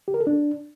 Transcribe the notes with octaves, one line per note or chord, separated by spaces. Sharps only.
G4
A#4
A4
D4